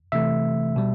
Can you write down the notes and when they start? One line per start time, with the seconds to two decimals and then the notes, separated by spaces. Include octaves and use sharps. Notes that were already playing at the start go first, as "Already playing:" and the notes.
0.12 C3 E3 A3 E5
0.76 B2 G3